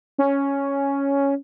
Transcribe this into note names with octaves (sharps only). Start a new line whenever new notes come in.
C#4